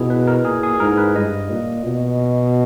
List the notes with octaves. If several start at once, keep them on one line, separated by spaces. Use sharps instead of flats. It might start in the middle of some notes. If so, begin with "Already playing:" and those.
Already playing: B2 E4 G#4
B4
A#4
A#2 G#4
G#4
G#2 A#4
B4
G2 D#5
A#2
B2